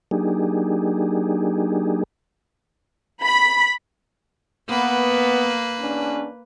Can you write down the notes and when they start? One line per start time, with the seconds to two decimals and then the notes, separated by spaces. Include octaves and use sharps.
0.11 F#3 A#3 D4 D#4 G4 G#4
3.24 B5
4.69 A#3 B3 B4
5.80 E2 C#4 D4